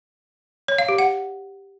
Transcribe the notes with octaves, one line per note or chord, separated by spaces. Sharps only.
C#5
F5
G4
F#5